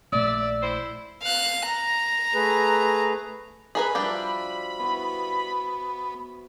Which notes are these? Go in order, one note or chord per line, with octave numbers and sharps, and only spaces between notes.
A#1 A3 D5 E5
E4 C5
F5 F#6
A#5
A3 G#4 B4
G#4 A#4 B4 B5
F3 G3 D4 F#4 E5 G5
B3 E4 F#4 B4